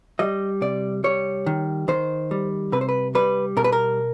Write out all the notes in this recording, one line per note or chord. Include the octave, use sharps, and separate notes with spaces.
G3 D#5
C3 D5
G3 C#5
D#3
D#3 C5
G3
C3 B4
C5
B4
G3 B4
B2 A#4
B4
A#4